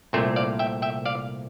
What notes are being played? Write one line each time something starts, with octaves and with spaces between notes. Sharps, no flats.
C2 A#2 A3 C4 C5 E5
D5 F5
E5 G5
E5 G5
D5 F5